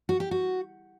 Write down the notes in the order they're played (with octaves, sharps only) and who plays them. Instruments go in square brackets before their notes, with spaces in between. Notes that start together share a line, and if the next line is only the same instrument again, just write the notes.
[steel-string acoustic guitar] F#4
G4
F#4